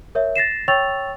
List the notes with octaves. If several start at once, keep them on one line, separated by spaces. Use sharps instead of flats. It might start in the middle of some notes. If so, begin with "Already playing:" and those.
A#4 C#5 E5
A6 A#6 C7 E7
C#5 G5 C#6 E6 A6 F7